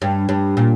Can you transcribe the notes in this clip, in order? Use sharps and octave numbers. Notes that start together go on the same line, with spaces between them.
G2
G2
A#2